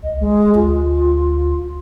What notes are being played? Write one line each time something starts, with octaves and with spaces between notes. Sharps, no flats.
C#2 D#5
G#1 G#3
D2 F4